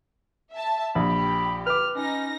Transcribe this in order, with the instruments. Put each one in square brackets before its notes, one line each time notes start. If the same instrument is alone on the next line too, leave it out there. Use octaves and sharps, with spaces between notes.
[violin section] E5 A5
[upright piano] A#1 [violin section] G4 [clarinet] B5
[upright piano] B4 D6 [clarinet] F6
[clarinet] C#4 [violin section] D#4 A#6